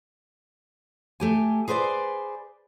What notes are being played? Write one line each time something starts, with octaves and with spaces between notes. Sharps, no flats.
A3 G4 G#5
G#4 B4 C5 D5 G#5